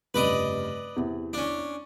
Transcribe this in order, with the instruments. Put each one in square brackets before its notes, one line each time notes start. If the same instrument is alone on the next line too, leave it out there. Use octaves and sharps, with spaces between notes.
[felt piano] F1 G2 C#3 [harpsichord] B4 D5 D#5
[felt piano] E2 C3
[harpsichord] C#4 D4